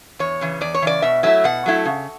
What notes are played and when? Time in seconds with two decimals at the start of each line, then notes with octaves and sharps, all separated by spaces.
0.19 E2 C#5
0.41 C#3 E3
0.61 E2 D5
0.74 C#5
0.82 C#3 E3 D5
1.02 B2 E5
1.23 F#3 A3 E4 E5
1.44 B2 F#5
1.66 F#3 A3 E4
1.85 C#3